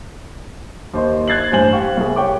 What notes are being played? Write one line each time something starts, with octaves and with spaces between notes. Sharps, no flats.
D#2 C5 D#5 C6
F#6 G#6 A6 C7 F#7
A1 G2 C5 G#5 F#7
G4 F5 C#6
C2 G#4
G4 C#5 G5 C#6 D6